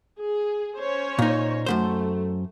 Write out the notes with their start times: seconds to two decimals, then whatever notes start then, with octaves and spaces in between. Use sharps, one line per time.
0.19 G#4
0.79 C#4 C5 C#5
1.19 A#2 D#4
1.66 F#2 B2 A3 C5